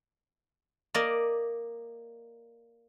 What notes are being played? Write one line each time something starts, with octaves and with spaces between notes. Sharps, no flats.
A#3 A#4 D5 D#5